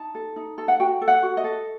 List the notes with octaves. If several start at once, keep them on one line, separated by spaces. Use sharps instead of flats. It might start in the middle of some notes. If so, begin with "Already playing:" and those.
Already playing: D#4 A5
A4
D#4
A4
F#5
F#4 G5
A4
F#5
F#4
D#5
A4